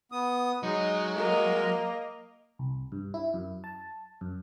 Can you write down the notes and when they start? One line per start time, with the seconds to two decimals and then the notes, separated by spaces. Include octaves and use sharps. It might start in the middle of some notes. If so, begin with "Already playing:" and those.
0.12 B3 D#6
0.63 F#3 G#3 D#4
1.15 A#3 A#4 D#5
2.59 C2
2.92 G2
3.14 E4
3.34 F#2
3.64 A5
4.21 F#2